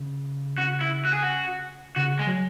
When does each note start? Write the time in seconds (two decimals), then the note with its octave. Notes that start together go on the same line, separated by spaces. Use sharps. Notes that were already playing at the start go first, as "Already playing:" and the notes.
Already playing: C#3
0.58 C#3 F#4
0.81 E4
1.05 F#4
1.13 G#4
1.23 F#4
1.96 C#3 F#4
2.19 G#3
2.27 F#3